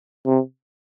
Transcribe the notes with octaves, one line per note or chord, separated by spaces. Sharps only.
C3